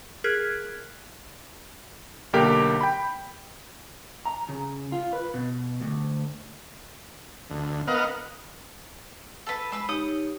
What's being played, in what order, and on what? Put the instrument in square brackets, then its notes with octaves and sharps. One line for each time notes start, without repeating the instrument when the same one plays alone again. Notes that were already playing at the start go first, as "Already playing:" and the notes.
[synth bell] G#4 A#4 F6 F#6 G#6 B6
[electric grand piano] B1 D3 A#3 G4 A#4 D6
G5 B5
[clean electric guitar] A#5
C#3
F4
B4
B2
D2
[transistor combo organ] D2
B3 A#4 D#5 F5 F#5
[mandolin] A4 B4
[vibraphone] G#3 [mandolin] B4 B5 E6
[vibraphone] D#4 G4 C#5 [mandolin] D#6